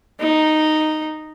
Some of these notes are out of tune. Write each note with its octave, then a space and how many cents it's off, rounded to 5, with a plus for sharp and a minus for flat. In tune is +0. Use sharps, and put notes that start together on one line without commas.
D#4 -5